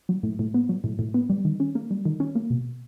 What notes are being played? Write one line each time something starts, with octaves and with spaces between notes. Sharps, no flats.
F#3
A2
A2
B3
F#3
A2
A2
B3
G3
D#3
C#4
A#3
G3
D#3
C#4
A#3
B2